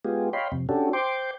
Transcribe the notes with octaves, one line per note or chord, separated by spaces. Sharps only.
G#3 B3 F4 G4 G#4
C#5 D#5 F5 G5 B5 C6
F2 C3
C#4 D4 F#4 G4 A4
C5 G5 C6 D6